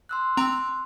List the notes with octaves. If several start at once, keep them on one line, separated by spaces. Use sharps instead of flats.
C6 E6 F#6
C4 A#5